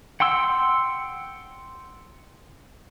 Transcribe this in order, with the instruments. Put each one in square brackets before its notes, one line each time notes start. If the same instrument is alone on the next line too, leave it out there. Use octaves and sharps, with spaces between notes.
[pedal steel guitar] F#5 G5 C6 E6